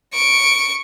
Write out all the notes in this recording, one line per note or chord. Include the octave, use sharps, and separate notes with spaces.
C#6 D7